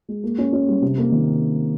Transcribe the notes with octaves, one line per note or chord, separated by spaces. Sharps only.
G#3
A#3
C#4
C#4
G3
C3
A#3
D#3